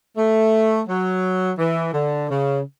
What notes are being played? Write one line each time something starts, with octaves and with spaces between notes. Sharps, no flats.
A3
F#3
E3
D3
C#3